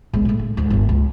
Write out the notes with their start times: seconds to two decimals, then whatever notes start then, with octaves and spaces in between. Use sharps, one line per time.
0.14 B1 G#3
0.25 A2 G#3
0.39 D3
0.57 D2 G#2
0.70 G1 F4
0.89 C#2